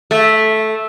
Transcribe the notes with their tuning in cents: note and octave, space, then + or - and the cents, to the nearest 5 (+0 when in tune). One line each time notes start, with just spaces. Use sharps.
A3 -10